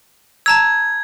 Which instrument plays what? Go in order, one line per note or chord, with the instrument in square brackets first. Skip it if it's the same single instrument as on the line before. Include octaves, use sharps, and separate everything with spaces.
[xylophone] A5 A#5 E6 [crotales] G#6